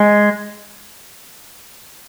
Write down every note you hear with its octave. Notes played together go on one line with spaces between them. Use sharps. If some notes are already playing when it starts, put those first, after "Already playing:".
Already playing: G#3